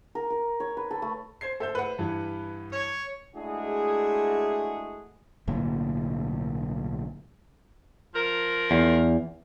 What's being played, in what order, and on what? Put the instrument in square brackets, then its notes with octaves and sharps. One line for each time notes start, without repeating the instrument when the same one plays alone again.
[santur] A#4
A#4
C#5
B4
A4
A3
[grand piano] C5 G#6 C7
[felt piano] A4 [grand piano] C5 E5 G6
[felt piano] B4 F#5
[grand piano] G2 E3
[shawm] C#5
[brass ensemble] G#3 A3 D4 E4 F#4 G#4
[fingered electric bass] B1 A2 D3 A#3
[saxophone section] F3 A#4
[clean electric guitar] E2